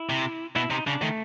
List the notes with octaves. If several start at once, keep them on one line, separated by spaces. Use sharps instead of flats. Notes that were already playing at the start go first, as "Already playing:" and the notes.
Already playing: E4
C3
B2 E4
C3 D#4
C#3 D4
D#3 A3